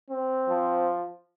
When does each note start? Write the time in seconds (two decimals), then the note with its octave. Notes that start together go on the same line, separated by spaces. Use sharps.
0.10 C4
0.49 F3